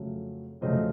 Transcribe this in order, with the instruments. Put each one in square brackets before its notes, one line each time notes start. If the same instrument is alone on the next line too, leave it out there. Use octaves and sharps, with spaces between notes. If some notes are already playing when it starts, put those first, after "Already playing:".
Already playing: [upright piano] F2 C#3 F#3 A3
F2 C#3 F#3 A3 C5 D#5